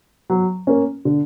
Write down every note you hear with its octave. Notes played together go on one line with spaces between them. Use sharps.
F#3
A#3 C#4
D3